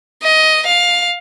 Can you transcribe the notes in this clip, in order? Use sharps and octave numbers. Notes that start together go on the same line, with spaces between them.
D#5
F5